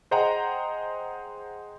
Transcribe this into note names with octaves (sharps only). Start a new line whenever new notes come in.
G#4 C5 D#5 F#5 G5 A#5